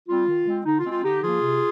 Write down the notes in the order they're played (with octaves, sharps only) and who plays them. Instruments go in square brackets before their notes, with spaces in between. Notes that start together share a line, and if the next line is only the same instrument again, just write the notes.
[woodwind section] G3 C4 F4
D#3
G#3 C4
D3 D#4
F4
G#3 C4
F4
D3 D#4 G4
F3 A#3 F4 G#4
C3